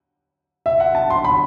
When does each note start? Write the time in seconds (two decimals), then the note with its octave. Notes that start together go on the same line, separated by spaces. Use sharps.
0.66 E5
0.80 F#5
0.95 A5
1.10 C6
1.24 B5